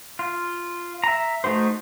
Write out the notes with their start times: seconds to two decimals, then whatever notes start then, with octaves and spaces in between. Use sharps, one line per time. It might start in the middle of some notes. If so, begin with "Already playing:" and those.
0.19 F4
1.04 E5 A#5
1.44 A3 D#4 F#4 C5